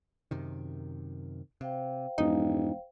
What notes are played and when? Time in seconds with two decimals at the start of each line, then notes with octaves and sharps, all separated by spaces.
0.31 F#2 C3 D#3
1.61 C3 C5 F5 G5
2.18 E1 F2 G#2 D#4